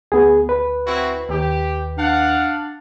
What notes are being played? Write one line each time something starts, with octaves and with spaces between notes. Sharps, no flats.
D2 B3 G#4
B4
C4 E4 F#4
D#2 G4
D4 F5 F#5